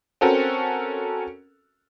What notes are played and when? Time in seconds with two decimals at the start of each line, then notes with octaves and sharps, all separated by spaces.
0.21 C4 C#4 F#4 A4 A#4